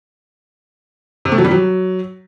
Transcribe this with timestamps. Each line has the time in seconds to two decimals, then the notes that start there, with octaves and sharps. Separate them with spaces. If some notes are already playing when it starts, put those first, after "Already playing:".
1.25 C3
1.32 A3
1.38 F#3
1.45 G3
1.51 F#3